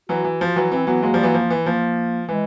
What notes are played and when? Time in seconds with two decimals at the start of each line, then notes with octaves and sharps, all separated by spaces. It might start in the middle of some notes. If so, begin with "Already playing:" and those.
0.09 E3 F#3 F#4
0.24 E3
0.41 F3
0.56 E3 F#3
0.72 E3 C4
0.87 E3 F#3 B3
1.03 F#3 G#3 A#3
1.14 F3 G3
1.23 E3 F#3
1.34 F3
1.50 E3
1.66 F3 A#3
2.28 E3 G#3